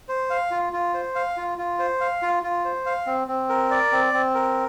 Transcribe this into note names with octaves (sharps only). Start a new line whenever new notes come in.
C5
F5
F4
F4
C5
F5
F4
F4
C5
F5
F4
F4
C5
F5
C4
C4
A#4
D5
C4
C4
A#4